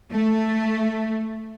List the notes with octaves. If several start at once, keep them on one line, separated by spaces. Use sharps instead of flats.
A3